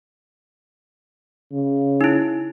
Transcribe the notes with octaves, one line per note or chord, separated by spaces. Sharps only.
C#3
D#4 E4